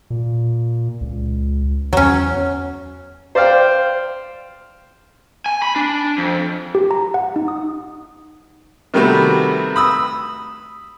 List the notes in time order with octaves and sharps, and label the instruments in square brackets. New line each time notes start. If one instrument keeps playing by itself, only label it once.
[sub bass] A#2
C#2
[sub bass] E2 [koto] F#3 C#4
[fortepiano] C5 D5 F5 G5
[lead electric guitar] G#5
B5
D4
F2
[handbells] G4
A#5
F#5
D#4
D#6
[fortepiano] C3 D#3 G3 A3 B3 F#4
B5 D#6 E6